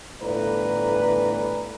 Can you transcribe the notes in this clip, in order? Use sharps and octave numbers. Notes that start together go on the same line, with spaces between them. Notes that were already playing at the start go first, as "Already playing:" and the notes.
G1 A2 E3 B4 D5 A#5